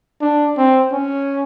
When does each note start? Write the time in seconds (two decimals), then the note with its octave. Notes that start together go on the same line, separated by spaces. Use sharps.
0.21 D4
0.57 C4
0.92 C#4